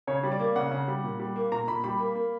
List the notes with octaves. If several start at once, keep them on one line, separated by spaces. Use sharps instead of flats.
C#3 C#5
G3
D5
A#3
C#3 F#5
C#3
G3
A#2
G3
A#3
A#2 A#5
A#2 B5
G3 B5
A#3
A#3